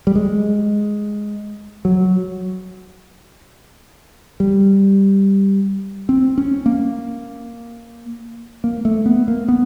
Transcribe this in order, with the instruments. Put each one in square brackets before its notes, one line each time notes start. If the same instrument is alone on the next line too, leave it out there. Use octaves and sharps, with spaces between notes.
[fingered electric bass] G3
G#3
F#3
G3
C4
C#4
A#3
A#3
A3
B3
A#3
B3